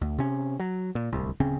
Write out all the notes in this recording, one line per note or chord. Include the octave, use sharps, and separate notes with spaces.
D2
C3 C#4
F#3
A#2
D1 C2
D1 C#3 C4 C#4